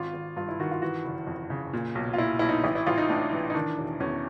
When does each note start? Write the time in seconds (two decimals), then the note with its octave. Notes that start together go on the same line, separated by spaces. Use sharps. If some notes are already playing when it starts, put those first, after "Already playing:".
Already playing: G#1 F4
0.14 G#1
0.36 G2 F4
0.49 E4
0.60 D#3 F#4
0.71 F4
0.82 E3 F#4
1.05 F#1
1.27 F2
1.50 C#3
1.73 A#2
1.95 B1
2.14 F4
2.18 A#2 E4
2.39 B1 E4
2.49 D#4
2.64 A1 E4
2.75 E4
2.86 A1 F4
2.98 D#4
3.09 A2 D4
3.32 E3
3.50 D#4
3.55 D#3 D4
3.78 E1
4.00 E2 C#4